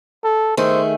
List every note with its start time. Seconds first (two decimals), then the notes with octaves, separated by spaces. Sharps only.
0.24 A4
0.57 D#3 A3 G#4 C5